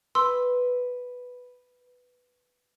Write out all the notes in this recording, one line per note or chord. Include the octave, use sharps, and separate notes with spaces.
B4 C6 E6